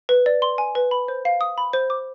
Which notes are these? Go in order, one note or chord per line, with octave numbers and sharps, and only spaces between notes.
B4
D5
C6
G#5
B4
B5
C5
F5
D#6
B5
C5
D6